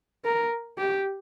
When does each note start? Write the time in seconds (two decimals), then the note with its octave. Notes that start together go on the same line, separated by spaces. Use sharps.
0.25 A#4
0.78 G4